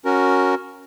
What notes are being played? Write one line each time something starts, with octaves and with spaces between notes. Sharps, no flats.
C#4 F#4 A#4